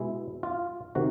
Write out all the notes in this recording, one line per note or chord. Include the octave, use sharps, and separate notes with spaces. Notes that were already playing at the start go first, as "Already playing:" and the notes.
Already playing: B2 G#3 E4
F4
C3 D#3 F#4